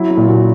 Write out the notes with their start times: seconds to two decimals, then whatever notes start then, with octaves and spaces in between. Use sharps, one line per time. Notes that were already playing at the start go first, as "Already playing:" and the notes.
Already playing: F#3 E4
0.10 E4
0.17 A#2
0.28 F#4